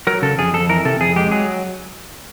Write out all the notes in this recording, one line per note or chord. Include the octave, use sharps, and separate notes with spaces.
F#3 A#4
C#3 A4
F2 G#4
F2 A4
E3 A#4
C3 A4
F2 G#4
G#3 G4
F#3 G#4